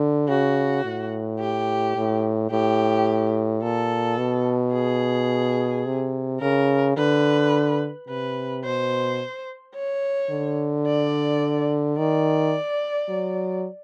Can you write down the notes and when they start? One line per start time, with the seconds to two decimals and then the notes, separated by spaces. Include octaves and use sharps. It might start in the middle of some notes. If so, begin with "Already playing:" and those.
Already playing: D3
0.28 C#3 F#4
0.85 A2
1.39 G4
1.96 A2
2.51 A2 G4
3.62 A#2 A4
4.18 B2
4.73 G#4
5.86 C3
6.41 C#3 A#4
6.97 D3 B4
8.08 C3 B4
8.64 B2 C5
9.75 C#5
10.31 D3
10.86 D5
11.98 D#3 D5
13.09 F#3